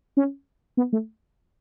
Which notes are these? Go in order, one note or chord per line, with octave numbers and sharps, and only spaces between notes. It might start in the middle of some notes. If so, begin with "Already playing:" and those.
C#4
B3
A3